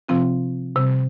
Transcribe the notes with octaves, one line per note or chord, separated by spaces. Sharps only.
C3 F3 C4 F4
C3 G3 C4